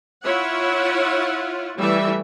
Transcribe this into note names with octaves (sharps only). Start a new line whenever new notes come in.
E4 F4 C#5 E5 F#5
E3 G3 A3 E5